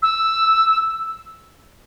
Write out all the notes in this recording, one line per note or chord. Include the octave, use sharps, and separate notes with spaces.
E6